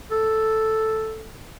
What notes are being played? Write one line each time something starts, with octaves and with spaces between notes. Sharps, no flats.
A4